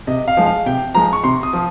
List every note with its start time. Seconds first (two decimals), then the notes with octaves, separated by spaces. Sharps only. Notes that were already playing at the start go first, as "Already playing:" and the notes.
0.07 C3 D#5
0.28 F5
0.37 F3 G#3
0.46 F5
0.66 C3 G5
0.94 F3 G#3 A#5
1.13 C#6
1.24 C3 C6
1.43 D#6
1.53 F3